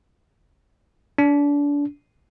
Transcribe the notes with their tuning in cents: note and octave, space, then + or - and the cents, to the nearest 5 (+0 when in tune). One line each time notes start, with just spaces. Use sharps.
D4 -30